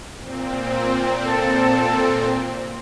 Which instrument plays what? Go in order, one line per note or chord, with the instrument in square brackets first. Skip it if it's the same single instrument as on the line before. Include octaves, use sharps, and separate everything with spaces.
[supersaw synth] A#2 C4
[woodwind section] A4